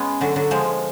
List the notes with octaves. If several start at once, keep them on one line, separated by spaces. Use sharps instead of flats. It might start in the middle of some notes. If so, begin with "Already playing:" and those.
Already playing: G#3 B3 C#4
D3 F#3
D3 F#3
F3 G#3